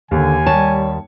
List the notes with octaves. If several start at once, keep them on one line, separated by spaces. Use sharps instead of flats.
D#2 D3 G#5
D#2 G3 C#5 A5